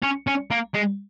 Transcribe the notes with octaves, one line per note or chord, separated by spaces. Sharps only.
C#4
C#4
A#3
G#3